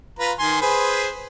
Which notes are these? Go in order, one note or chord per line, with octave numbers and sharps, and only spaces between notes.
F4 B4 A#5
D#3 G#5 C6
G#4 B4 C5